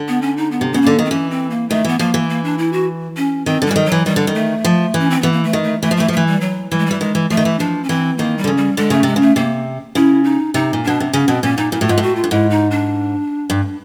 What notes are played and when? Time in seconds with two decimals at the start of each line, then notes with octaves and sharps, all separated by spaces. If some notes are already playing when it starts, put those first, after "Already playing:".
Already playing: D3
0.08 B3
0.22 C#4
0.37 D#4
0.51 B3
0.61 C3
0.73 C#3 B3
0.82 D3 A#3
0.99 D#3
1.05 C4
1.10 E3 C#4
1.31 C4
1.50 A#3
1.69 D#3 A3
1.84 E3 B3
1.99 F3 A#3
2.14 E3
2.29 A#3
2.44 D4
2.58 E4
2.73 F#4
3.17 C#4
3.46 D#3 C4
3.62 D3
3.67 E3 G3
3.76 D#3
3.86 F#3
3.92 E3
4.05 D#3 G3
4.16 D3
4.27 D#3
4.35 A3
4.64 F3
4.94 E3
4.99 C#4
5.10 C4
5.22 E3 B3
5.33 A#3
5.44 A3
5.53 D#3
5.64 A3
5.82 E3 A3
5.91 F3
5.97 E3 A3
6.08 F3
6.13 E3 A3
6.27 G3
6.41 F#3
6.71 E3 G3
6.78 G#3
6.86 E3 G3
7.00 D#3 G#3
7.15 E3
7.30 F3 A3
7.37 D#3
7.45 E3
7.59 F3 D4
7.83 C#4
7.89 E3 C4
8.18 D#3 A#3
8.38 G3
8.44 D3
8.47 C#3
8.57 G3
8.77 D3 G#3
8.90 C#3 A3
9.03 C3 G#3
9.16 C#3
9.22 A3
9.36 C3 A#3
9.95 C#3 E4
10.24 D#4
10.54 C3 D#4
10.73 A#2
10.84 B2 D4
11.00 C3
11.13 C#3 C#4
11.28 B2 C4
11.43 A#2 C#4
11.57 A#2 D#4
11.72 A#2 E4
11.81 A2 F#4
11.87 G#2 F4
11.98 A2 F#4
12.16 F4
12.24 G2
12.31 G#2 E4
12.50 D#4
12.71 D4
13.50 G2